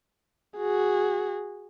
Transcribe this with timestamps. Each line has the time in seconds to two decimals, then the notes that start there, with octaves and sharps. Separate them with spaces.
0.57 F#4 G#4